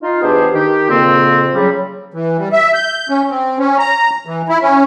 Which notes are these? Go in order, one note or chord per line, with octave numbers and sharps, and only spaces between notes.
D#4 F4
E2 B3 D4 G4 G#4 C5
D#3 G4
F2 A#2 C#3 A#3 C4
C#3 F#3 G3
E3
G3
E5
G6
C#4
C4
C#4
A#5
E3
E4
C#4